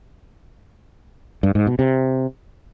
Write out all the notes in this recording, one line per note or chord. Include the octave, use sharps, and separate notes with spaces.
G2
G#2
B2
C3